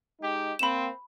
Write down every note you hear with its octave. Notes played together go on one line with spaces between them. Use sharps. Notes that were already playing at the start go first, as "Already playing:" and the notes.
G#3 D#4 G4
A#3 C4 B5 E7